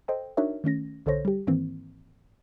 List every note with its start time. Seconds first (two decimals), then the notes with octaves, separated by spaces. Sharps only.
0.08 A4 C5 D#5 G5
0.37 D4 D#4 F#4 A#4 C#5 E5
0.64 D#3 A3 C#4 A#6
1.06 B1 D3 A4 C5 C#5 A#6
1.25 G3 G4
1.47 G#2 D#3 E3 A#3 C4